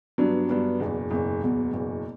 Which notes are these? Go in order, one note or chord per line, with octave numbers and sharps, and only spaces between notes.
G2 F#3 B3 D4
G2 F#3 B3 D4
F#1 E2 B2
F#1 E2 B2
F#1 E2 B2
F#1 E2 B2